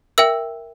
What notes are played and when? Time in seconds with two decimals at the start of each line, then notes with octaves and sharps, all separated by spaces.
0.18 A#4 E5 G5 E6